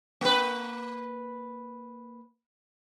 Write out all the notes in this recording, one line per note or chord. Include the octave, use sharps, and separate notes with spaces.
A#3 B4